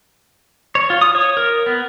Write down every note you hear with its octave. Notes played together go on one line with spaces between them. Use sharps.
C#5
F4
D#6
C#5
A#4
B3